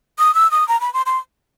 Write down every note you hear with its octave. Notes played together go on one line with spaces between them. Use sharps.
D#6
E6
D#6
A#5
B5
C6
C6